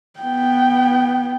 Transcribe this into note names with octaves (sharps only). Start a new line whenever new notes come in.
B3 G5